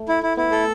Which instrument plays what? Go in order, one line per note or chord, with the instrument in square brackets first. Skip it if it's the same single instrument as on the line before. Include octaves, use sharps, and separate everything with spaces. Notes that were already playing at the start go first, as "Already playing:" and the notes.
Already playing: [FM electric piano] A3
[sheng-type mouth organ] E4
E4
[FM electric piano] B3 [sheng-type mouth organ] E4
[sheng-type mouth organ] A4